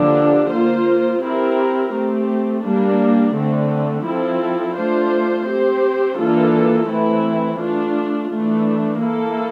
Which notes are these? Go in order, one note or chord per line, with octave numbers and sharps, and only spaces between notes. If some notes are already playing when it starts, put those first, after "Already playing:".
Already playing: D3 F3 A#3 D4 G4
A#3 F4 C5
C4 E4 G4 A#4
A3 C4 G4
G3 A#3 D4
D3 A3 C4
F3 C4 E4 A4
A3 D4 F4 C5
C4 G4 C5
E3 A#3 D4 F4 A4
E3 A3 C4 E4
A3 D4 F4
E3 A3 D4
A#3 E4 A4